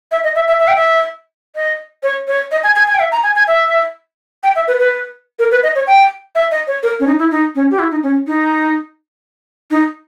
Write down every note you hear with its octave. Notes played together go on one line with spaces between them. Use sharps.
E5
D#5
E5
E5
E5
G5
E5
D#5
C#5
C#5
D#5
G#5
G#5
G#5
G5
E5
A#5
G#5
G#5
E5
G5
E5
B4
B4
A#4
B4
D#5
C#5
G5
E5
D#5
C#5
A#4
C#4
D#4
E4
D#4
C#4
G4
E4
D#4
C#4
D#4
D#4